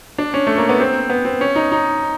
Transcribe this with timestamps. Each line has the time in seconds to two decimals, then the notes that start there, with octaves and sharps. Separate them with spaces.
0.18 D4
0.34 C#4
0.47 A3
0.58 A#3
0.69 B3
0.80 C4
1.10 B3
1.25 C4
1.41 C#4
1.56 D#4
1.72 D#4